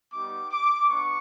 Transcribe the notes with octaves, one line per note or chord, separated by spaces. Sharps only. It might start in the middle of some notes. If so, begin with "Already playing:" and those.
G3 B3 D#4 G4 D6
D6
B3 D4 C#6